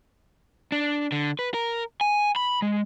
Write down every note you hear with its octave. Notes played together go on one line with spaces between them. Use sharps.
D4
D3
B4
A#4
G#5
B5
G#3